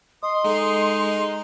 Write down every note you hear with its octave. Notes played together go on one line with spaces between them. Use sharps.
D#5 C6 D#6
G#3 D#4 A4